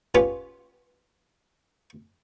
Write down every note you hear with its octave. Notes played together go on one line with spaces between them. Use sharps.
B3 C#4 F4 G4 B4 C#5